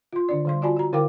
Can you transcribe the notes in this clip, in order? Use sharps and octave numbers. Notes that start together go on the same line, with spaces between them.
F4 C6
D3 D4 D5
D3 G3 C6
F4 F#4 D5 G#5 A5 B5
F#4 A#5
D3 E4 A#4 F5 G5 D6